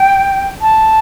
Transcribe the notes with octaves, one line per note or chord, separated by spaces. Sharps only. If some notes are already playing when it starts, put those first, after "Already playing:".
Already playing: G5
A5